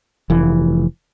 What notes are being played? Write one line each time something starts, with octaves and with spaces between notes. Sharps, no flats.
F1 E3